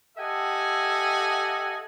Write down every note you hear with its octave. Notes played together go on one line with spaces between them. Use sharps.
G4 A4 D#5 E5 F#5 G#5